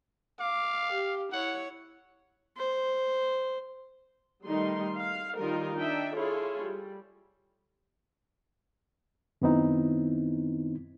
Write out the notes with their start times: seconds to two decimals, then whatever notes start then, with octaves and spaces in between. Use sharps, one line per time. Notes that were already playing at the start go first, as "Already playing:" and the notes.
0.40 F5 D6
0.93 G4
1.32 E4 C#5 F#5
2.57 C5
4.46 D#3 G3 A3 D#4 C6
4.99 F5
5.37 D#3 G3 D#4 F4 A#4
5.77 D4 D#4 E5 G5
6.15 E4 F4 G#4 A4 C#5
6.62 G3
9.42 F#2 D#3 B3 C4 D#4 E4